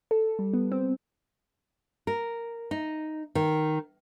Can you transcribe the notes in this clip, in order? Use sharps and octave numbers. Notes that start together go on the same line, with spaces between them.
A4
G3
B3
C4
A#4
D#4
D#3